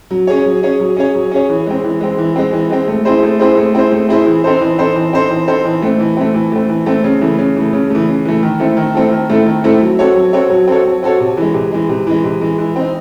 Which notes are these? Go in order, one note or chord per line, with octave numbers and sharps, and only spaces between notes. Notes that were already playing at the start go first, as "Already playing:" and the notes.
F#3
C#4 G#4 C#5
F#3
C#4 G#4 C#5
F#3
C#4 G#4 C#5
F#3
C#4 G#4 C#5
E3
G#3 C4
E3
G#3 C4
E3
G#3 C4
E3
G#3 C4
A3
C4 E4 G#4 C5
A3
C4 E4 G#4 C5
A3
C4 E4 G#4 C5
A3
C4 E4 G#4 C5
E3
C4 D#4 A4 C5
E3
C4 D#4 A4 C5
E3
C4 D#4 A4 C5
E3
C4 D#4 A4 C5
E3
A3 C4
E3
A3 C4
E3
A3 C4
E3
A3 C4
C#3
E3 A3
C#3
E3 A3
C#3
E3 A3
C#3
E3 A3
D#3
A3 C4 E4 A4
D#3
A3 C4 E4 A4
D#3
A3 C4 E4 A4
D#3
A3 C4 E4 A4
F#3
C4 F#4 A4 C#5
F#3
C4 F#4 A4 C#5
F#3
C4 F#4 A4 C#5
F#3
C4 F#4 A4 C#5
C3
E3 G#3
C3
E3 G#3
C3
E3 G#3
C3
E3 G#3
E3
C4 D#4